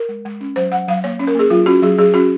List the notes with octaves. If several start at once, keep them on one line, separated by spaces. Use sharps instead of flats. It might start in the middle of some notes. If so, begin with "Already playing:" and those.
Already playing: A#4
G#3
G#3
C#4
F#3 C5
F#3 F#5
F#3 F5
A#3 C#5
C#4
A#4
A#3 G#4
F#3 F4
C#4 F#4
F#3 G#4
F#3 G#4
C#4 F#4